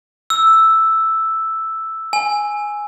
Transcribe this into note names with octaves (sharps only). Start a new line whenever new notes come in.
E6
G#5